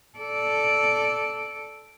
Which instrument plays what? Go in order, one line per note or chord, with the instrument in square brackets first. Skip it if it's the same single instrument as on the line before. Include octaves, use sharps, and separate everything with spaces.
[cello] A4 D5